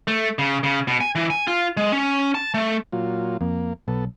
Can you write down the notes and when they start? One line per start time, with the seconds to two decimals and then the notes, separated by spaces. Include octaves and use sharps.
0.08 A3
0.39 C#3
0.63 C#3
0.88 B2
1.01 G#5
1.15 E3
1.30 G#5
1.47 F4
1.77 G#3
1.92 C#4
2.35 A5
2.54 A3
2.92 A#2 F#3 F4
3.41 F2 A#3
3.88 B1 B3 A4